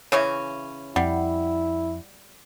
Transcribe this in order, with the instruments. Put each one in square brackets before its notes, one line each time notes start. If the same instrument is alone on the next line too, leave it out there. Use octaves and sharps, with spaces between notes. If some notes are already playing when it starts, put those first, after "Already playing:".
[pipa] C#3 E3 C#4 [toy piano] C#5 E5
[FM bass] F2 [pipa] G3 [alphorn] E4 [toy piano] F#5